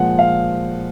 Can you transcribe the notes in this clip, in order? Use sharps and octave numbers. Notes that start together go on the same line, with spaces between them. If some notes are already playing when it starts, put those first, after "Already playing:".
Already playing: A#2 F3 G#3 F#5
F5